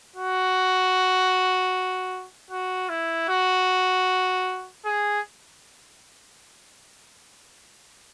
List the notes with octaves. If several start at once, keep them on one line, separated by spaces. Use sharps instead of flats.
F#4
F#4
E4
F#4
G#4